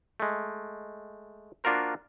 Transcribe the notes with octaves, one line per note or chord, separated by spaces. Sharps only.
G#3 A3
A#3 D4 F4 F#4 A#4 C5